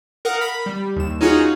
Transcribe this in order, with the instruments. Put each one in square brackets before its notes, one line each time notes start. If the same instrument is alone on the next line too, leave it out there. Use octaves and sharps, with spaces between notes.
[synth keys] A#4 F5 F#5 D#6
B5
G3
D#2 E7
C#4 D#4 F4 F#4 G#4